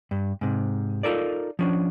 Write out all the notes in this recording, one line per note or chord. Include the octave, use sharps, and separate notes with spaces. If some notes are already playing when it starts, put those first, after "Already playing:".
G2
G#2 C3
D#4 F4 A4 A#4 D5
F3 C#4 D4